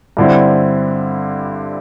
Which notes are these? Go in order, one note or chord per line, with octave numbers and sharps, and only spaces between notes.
G2 D3 C4 E4